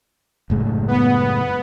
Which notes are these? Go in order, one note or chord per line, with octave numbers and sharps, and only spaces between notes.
F#1 A2 G#3
B3